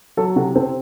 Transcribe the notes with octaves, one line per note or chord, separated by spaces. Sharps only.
F#3 F#4 A4
C3 F#4 A4
C4 A4 C5